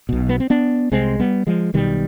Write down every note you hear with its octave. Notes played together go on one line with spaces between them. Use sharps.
B1 B2
B3
C4
B3 D4
C2 C3 G#3 C4
G3 B3
F3 G#3
B1 B2 D#3 G3